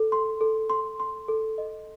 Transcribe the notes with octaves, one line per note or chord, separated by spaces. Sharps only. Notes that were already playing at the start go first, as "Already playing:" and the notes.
Already playing: A4
C6
A4
C6
C6
A4
D#5